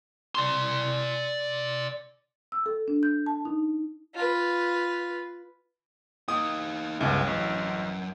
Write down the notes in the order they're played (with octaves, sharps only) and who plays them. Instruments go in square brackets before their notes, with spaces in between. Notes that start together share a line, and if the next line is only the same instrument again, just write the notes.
[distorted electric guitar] D5 C6
[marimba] E6
A4
D4
G6
A5
D#4
[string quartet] F4 B4
[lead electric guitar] D#4 G4 [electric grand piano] D#6
[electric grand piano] G1 C#2 [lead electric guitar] F#2 E5
[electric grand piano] A1